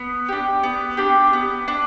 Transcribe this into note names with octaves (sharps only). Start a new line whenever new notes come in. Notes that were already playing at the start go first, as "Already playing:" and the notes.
Already playing: B3
D4 G4
B3
D4 G4
B3
D4